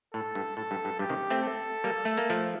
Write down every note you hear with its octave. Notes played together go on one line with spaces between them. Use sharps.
A2 A4
G2
A2 A4
G2
G2
G2 G4
C3 D#3
A3 C4
A4
G3 A#3
A3
A#3
F3 A3